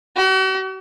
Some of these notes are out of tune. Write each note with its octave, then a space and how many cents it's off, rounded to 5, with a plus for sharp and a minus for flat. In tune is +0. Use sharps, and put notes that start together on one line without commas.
F#4 +45